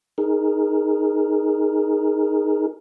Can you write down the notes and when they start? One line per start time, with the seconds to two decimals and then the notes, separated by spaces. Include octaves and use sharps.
0.18 D#4 G#4 A#4